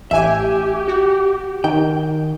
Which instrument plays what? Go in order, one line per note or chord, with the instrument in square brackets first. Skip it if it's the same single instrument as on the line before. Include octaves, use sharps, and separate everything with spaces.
[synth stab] A1 G#5 [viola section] G4 [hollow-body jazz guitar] E5
[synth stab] F#4
[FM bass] D#3 [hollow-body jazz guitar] G5